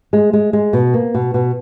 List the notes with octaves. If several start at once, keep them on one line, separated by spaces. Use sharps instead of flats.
G#3
G#3
G#3
B2
A#3
B2
B2